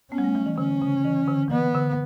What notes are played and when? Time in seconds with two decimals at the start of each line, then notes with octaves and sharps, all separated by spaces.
0.12 B3 C#4
0.18 G3
0.24 A3
0.35 F#3
0.46 E3
0.58 D3 C#4
0.82 C#3
1.04 E3
1.28 D3
1.51 E3 B3
1.74 D3